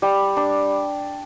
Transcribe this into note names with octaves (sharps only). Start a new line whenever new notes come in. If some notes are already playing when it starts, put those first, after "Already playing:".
G3
D4